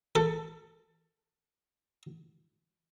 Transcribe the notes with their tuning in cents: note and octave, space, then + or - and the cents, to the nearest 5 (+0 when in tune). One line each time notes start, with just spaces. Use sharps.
A4 +20